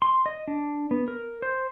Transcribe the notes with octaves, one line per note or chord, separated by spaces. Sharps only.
C6
D#5
D4
B3
A#4
C5